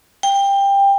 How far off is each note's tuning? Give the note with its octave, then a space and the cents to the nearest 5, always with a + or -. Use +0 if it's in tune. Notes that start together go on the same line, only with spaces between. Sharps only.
G5 +20